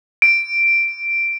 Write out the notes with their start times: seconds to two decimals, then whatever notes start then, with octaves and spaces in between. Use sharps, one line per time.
0.22 D7